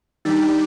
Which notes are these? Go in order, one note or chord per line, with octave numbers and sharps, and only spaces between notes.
D#3 G3 D4 D#4 G4